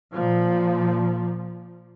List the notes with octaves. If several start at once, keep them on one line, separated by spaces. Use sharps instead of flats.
A#2 F3